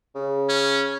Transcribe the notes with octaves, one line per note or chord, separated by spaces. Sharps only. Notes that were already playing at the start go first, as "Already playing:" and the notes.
C#3
C#4